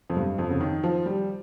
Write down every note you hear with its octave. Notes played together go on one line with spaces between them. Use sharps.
F2
G2
F2
C#3
D#3
F3
G3